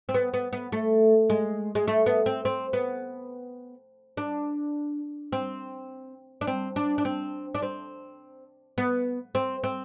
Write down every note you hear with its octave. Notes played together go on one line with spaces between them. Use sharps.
C4
B3
B3
B3
A3
G#3
G#3
A3
B3
C4
C4
B3
D4
C4
D4
C4
D4
D4
C4
D4
C4
B3
C4
C4